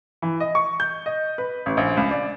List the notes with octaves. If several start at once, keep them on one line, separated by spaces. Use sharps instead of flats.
E3
D#5
C#6
G6
D#5
B4
A1
A#1
C#2
D5